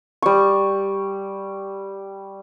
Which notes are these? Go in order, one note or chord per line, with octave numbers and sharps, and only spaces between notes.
G3 C#6